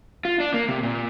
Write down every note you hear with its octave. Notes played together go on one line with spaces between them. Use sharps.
F4
D4
A#3
C3
A#2